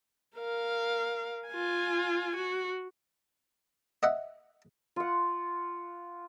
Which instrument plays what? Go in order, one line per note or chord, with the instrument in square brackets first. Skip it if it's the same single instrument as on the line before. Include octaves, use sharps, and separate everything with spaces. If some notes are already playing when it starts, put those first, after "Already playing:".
[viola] A#4 F5
F4 G#5
F#4
[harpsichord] D#5 E5 F#5
[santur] F4 F#5